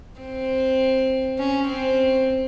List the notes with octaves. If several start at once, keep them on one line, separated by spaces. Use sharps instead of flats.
C4
C#4
C4